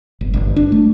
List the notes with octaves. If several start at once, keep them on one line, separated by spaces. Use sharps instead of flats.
G1
G1
D4
A3